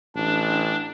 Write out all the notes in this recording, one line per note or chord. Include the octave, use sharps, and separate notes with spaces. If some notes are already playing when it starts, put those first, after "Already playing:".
A1 D4